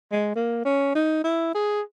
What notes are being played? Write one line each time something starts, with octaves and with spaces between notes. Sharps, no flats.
G#3
A#3
C#4
D#4
E4
G#4